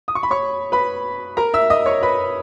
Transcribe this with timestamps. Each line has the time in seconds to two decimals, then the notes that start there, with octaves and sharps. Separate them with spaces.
0.08 D#6
0.15 C#6
0.23 B5
0.31 C#5 C#6
0.72 B4 B5
1.37 A#4 A#5
1.54 E5 E6
1.70 D#5 D#6
1.86 C#5 C#6
2.03 B4 B5